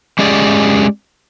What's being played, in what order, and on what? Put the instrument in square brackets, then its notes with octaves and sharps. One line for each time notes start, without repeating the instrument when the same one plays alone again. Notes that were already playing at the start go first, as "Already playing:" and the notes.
[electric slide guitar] G#3 C#4 G4 G#4 D5